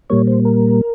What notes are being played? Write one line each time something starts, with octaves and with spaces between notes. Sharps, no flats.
A#2 G3 A#3 C#5
C5
A#4